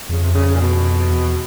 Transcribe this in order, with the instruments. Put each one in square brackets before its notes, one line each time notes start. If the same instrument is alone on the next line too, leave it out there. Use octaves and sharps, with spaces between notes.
[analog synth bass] F2 [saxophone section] C#3
[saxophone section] C3
C#3
A#2
B2
[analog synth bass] E2